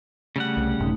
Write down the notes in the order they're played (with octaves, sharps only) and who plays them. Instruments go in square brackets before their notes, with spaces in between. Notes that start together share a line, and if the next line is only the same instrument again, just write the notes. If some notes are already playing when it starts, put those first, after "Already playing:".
[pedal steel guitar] C#3 G3 F#5 [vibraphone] A3
[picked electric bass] C2
[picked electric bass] A1 F#2 C3 [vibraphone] A3 D#4